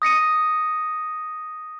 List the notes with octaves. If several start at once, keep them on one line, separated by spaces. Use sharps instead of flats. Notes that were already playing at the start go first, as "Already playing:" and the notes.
D#6 A#6 C#7 D#7